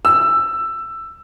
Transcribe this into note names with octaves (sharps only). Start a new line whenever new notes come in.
E6